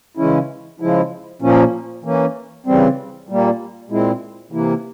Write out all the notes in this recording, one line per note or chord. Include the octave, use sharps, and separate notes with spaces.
C#3 E3 G#3 C#4 E4
C#3 F3 G#3 E4
A#2 F3 A#3 C#4
E3 A#3 C#4
C#3 E3 G3 C4
A#2 G3 A#3
A#2 G#3 C4 E4
C3 E3 A#3 E4